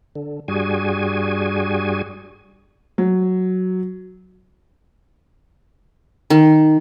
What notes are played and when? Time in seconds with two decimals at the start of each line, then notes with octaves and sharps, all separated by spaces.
0.15 D3
0.48 G2 G3 F#4 G#4 G#5
2.98 F#3
6.30 D#3